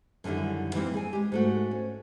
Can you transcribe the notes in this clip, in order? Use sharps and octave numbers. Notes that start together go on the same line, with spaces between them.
F#2 D3 D#3 G3 E4
E3 G3 A#3 C4
G#4 G#5
G#3 G4
G#2 A3 F#4
C#4